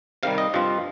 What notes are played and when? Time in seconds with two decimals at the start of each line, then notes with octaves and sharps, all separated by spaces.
0.23 C3 D#3 G3 F5
0.38 D#5
0.54 G2 F3 C4 F4